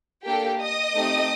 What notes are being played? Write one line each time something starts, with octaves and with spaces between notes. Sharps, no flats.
A#3 D4 G4 A4 G5
D#5 D#6
A3 C4 D#4 G4